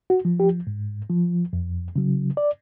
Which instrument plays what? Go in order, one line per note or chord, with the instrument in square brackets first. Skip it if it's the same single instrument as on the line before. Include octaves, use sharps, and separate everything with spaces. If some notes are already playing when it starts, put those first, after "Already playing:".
[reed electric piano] F#4
F3
G4
G#2
F3
F2
C#3 F#3
D5